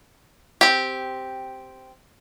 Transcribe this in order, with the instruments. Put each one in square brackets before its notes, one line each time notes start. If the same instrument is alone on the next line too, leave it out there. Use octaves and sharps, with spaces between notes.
[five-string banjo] C4 G4